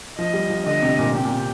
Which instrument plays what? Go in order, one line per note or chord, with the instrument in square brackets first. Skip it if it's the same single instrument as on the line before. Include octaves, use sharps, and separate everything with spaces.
[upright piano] F3 [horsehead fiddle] D#5
[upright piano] G3
F3
[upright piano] D3 [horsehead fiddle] D#5
[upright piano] C3
A#2
[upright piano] C3 [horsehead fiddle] G4
[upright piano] A#2
C3